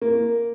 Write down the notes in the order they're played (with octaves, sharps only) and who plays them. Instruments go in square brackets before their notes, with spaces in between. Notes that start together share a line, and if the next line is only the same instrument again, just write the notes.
[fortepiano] A#3